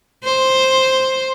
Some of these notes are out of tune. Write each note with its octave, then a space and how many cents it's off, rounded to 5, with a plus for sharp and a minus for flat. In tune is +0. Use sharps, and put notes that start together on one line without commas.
C5 +5